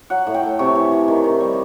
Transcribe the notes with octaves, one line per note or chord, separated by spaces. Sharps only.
F#3 F#5
A2
G5
A3
C3 C#5
E3
E3
D#3
D#3
G3